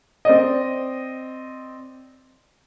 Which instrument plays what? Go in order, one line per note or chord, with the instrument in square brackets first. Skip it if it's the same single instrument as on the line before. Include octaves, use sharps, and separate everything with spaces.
[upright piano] C4 D5 D#5